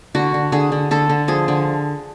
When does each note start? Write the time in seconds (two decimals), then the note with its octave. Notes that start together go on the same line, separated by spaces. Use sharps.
0.15 D3 F#4
0.34 D3
0.52 D3 G#4
0.72 D3
0.91 D3 A4
1.09 D3
1.28 F3 G#4
1.48 D3